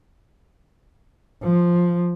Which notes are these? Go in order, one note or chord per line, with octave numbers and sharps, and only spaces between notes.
F3